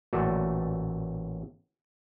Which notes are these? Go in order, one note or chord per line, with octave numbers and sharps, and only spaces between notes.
A1 A#2 A3 F#4 D5